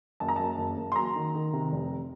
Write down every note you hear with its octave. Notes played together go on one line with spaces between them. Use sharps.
F#1 A5
A#5
F#2 A5
F#1
F#1
C6
F#3 A#5
D#3
D#3
C3
F1